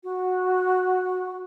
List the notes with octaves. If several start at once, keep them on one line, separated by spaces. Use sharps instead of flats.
F#4